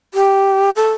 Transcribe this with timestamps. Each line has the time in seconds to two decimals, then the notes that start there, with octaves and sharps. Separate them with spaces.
0.14 G4
0.76 A4